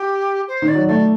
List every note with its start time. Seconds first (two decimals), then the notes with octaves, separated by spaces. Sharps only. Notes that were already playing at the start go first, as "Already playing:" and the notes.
Already playing: G4
0.48 C5
0.62 D#3
0.68 D5
0.75 F#3
0.88 A3 D5